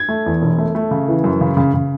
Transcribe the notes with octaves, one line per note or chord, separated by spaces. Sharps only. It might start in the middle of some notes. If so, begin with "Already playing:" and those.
Already playing: G#6
A3
E2
E1
A3
A3
C#3
E3
F#2
C#3
C#3
C#3